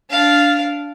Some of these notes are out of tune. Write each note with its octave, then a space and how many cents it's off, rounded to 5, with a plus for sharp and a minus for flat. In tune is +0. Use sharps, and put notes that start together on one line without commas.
D4 -15 F5 +0